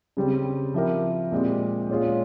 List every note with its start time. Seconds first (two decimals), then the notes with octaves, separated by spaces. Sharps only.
0.17 C#3 G3 C4
0.74 F3 C4 E4 G4 A#4
1.32 A#2 G#3 C4 G4
1.89 A#2 G#3 C#4 F4 G#4